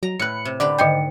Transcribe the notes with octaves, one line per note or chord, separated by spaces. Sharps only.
F#3 A#5
A2 B4 F#6 C#7
C3
D3 G4 B4 D5
G#2 D3 D#3 D#5 G5 G6 C#7